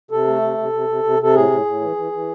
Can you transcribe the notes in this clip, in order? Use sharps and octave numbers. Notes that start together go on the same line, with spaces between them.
C3 A4
A3
C3
C3
C3
C3
C3
C3 A4
A2 G#4
A2
A2
E3
E3
E3